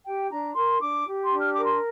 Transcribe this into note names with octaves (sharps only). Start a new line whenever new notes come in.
G4 G5
D4 A#5
A#4 C6
D4 D6
G4
C6
D4
F6
A#4 D6
C6